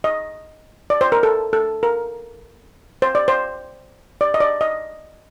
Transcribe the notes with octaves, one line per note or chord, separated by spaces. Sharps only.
D#5
D5
C5
A#4
A4
A4
A#4
C5
D5
C5
D5
D#5
D5
D#5